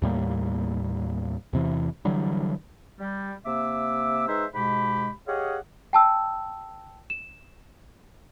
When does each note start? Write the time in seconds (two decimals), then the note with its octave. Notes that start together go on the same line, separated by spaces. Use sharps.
0.02 D#2 A2 G3 A#3
1.53 E2 C3 E3
2.05 D3 E3 F#3 G3
3.00 G3
3.46 C3 A#3 E5 D6 E6
4.28 G#3 D#4 B4 C5 E5
4.54 G#2 B2 G#3 G4 B5
5.28 G4 G#4 C#5 D#5 F5 F#5
5.93 G5 A5 E6
7.10 E7